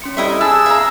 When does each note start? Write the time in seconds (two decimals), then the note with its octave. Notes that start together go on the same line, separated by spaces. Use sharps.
0.02 C#4 C6 C#7
0.17 G3 C#4 E4 A4 D#5 E5 D#6
0.41 G#4 A5 B5 E6 F#6
0.66 E5 F5 A#5